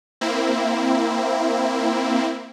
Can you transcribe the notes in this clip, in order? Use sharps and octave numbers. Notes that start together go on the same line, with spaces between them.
A#3 C4 E4